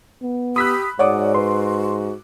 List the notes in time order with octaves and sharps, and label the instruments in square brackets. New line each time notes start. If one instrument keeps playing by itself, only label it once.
[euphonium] B3
[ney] G4 [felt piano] B5 E6 F#6 [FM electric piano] D#6 B6
[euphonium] G#2 [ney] F#4 [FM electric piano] C#5 D5 [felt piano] F#5 D6 D#6
[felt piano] B4 [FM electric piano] C6